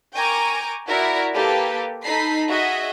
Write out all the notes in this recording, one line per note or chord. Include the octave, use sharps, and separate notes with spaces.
A#4 G5 G#5 A#5 C#6 D6
E4 F#4 A#4 D5 E5
A#3 G4 A4 B4
D#4 A4 B5 C7
F#4 G#4 D#5 E5